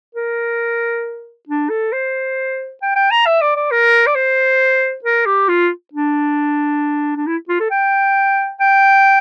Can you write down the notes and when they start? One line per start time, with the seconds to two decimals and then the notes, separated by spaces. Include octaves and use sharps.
0.15 A#4
1.49 D4
1.70 A4
1.93 C5
2.82 G5
2.96 G5
3.11 A#5
3.26 E5
3.42 D5
3.56 D5
3.71 A#4
4.07 D5
4.15 C5
5.04 A#4
5.26 G4
5.49 F4
5.94 D4
7.16 D4
7.27 E4
7.49 F4
7.60 A4
7.71 G5
8.60 G5